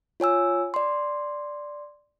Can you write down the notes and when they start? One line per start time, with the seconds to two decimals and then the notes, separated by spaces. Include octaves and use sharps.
0.20 F4 C#5 G#5 E6
0.74 D5 C6